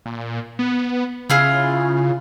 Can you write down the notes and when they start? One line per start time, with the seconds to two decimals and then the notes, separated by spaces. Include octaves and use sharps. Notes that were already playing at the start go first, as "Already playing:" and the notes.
0.06 A#2
0.59 B3
1.30 C#3 E4 F4 G#4